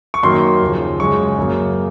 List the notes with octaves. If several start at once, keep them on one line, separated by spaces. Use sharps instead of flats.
C#6
F#2 D#3 F#3 A#3 C6
D#2 C#3 F3
F#2 C#3 G#3 C#6
F#2 C#3 F#3 A#3